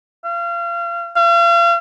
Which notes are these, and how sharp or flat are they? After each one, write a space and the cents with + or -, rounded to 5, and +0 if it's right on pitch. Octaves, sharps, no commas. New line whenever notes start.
F5 -30
F5 -40